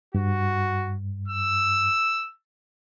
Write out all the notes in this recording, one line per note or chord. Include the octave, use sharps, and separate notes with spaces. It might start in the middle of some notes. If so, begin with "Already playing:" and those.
G2 F#4
E6